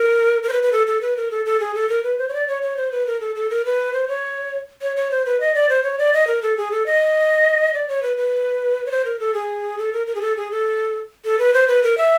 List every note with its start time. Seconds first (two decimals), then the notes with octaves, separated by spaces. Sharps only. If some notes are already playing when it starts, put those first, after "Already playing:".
Already playing: A#4
0.43 A#4
0.49 C5
0.53 B4
0.63 B4
0.73 A4
0.87 A4
1.01 B4
1.17 A#4
1.31 A4
1.46 A4
1.60 G#4
1.75 A4
1.89 A#4
2.03 B4
2.19 C5
2.29 C#5
2.34 D5
2.48 C#5
2.62 C#5
2.77 C5
2.92 B4
3.07 A#4
3.20 A4
3.36 A4
3.50 A#4
3.65 B4
3.93 C5
4.08 C#5
4.82 C#5
4.97 C#5
5.11 C5
5.26 B4
5.40 D#5
5.54 D5
5.69 C5
5.83 C#5
5.99 D5
6.13 D#5
6.27 A#4
6.42 A4
6.57 G#4
6.72 A4
6.86 D#5
7.74 D5
7.88 C#5
8.03 B4
8.17 B4
8.86 C#5
8.91 C5
9.05 A#4
9.20 A4
9.34 G#4
9.79 A4
9.93 A#4
10.07 A#4
10.15 G#4
10.22 A4
10.37 G#4
10.51 A4
11.25 A4
11.39 B4
11.54 C5
11.68 B4
11.83 A#4
11.98 E5